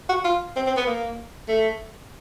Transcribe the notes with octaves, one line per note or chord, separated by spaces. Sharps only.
F#4
F4
C4
C4
B3
A#3
A3